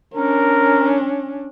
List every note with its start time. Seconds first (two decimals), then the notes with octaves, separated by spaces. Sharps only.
0.14 C#4 D4 A#4